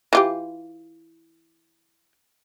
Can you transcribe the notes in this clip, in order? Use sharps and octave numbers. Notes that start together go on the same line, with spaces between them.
E3 F4 G4